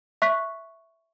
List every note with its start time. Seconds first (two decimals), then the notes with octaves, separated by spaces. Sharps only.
0.22 E5 C#6 F#6 B6